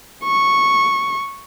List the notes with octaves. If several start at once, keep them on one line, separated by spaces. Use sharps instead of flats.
C#6